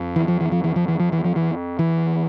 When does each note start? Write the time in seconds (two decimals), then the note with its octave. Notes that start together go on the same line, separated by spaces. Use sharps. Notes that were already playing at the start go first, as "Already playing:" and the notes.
Already playing: F2
0.16 E3
0.28 F3
0.41 E3
0.52 F3
0.64 E3
0.76 F3
0.88 E3
1.00 F3
1.12 E3
1.24 F3
1.36 E3
1.79 E3